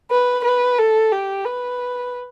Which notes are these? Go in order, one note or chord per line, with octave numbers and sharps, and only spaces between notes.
B4
B4
A4
G4
B4